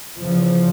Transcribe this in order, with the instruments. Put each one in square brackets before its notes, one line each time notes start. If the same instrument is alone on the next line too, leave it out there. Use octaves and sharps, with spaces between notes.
[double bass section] E2 C#3 F3